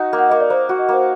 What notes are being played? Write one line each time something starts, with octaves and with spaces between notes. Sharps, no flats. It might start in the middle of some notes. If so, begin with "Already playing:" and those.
Already playing: D#4 F#4
A#3
F#5
A#3 D#5
D5
A#3 C5
F#4
D#5
A#3 C5